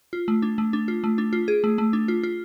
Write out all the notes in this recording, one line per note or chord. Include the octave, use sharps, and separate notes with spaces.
F4
A3
D4
A3
D4
F4
A3
D4
F4
G#4
A3
A3
D4
F4
F4